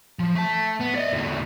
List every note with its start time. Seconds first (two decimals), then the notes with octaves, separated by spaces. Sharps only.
0.19 F3
0.35 A3 A5
0.80 B3
0.95 D5 D#5
1.12 E2 D3